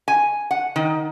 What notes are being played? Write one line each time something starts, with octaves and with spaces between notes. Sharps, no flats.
G#5
F#5
D#3